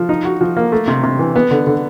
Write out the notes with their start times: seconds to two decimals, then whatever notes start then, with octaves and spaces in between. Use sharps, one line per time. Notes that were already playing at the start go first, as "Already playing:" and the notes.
Already playing: F3
0.09 D#4
0.25 F#4
0.41 F3
0.57 A#3
0.72 A3
0.88 C3
1.03 C3
1.19 E3
1.36 B3
1.51 D3
1.67 D3